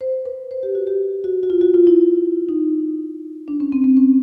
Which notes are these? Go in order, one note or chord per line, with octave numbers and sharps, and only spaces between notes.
C5
B4
C5
G4
F#4
G4
F#4
F#4
F4
F#4
F4
E4
D#4
D4
C#4
C4
C4
C#4